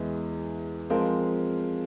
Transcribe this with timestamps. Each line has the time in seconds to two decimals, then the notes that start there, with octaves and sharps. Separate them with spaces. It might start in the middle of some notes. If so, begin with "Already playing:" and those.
Already playing: E2 E3 G#3
0.90 F3 G#3 C4 F4 A#4